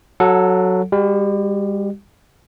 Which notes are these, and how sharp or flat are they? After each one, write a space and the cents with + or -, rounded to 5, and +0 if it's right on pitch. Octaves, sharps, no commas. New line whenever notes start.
F#3 +0 A4 +0 F#5 -30
G3 +40 G4 -35